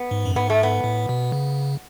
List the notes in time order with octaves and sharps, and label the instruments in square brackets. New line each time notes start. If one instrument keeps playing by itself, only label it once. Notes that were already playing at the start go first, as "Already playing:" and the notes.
Already playing: [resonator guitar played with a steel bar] B3
[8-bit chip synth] G#2
F#2
[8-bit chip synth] G#2 [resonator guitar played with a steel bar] B3
[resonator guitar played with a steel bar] A3
B3
[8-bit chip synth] A2
B2
C#3